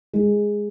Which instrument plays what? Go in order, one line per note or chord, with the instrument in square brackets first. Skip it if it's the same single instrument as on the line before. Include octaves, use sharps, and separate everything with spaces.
[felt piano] G#3